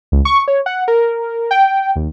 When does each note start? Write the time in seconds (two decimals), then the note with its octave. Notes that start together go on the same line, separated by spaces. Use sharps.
0.12 C#2
0.25 C#6
0.48 C#5
0.66 F#5
0.88 A#4
1.51 G5
1.96 D#2